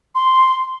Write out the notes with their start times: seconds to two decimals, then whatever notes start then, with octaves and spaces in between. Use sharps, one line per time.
0.15 C6